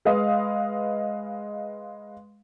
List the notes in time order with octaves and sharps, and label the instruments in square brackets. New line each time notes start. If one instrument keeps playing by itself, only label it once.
[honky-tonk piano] G#3 B4 D#5 F5 D#6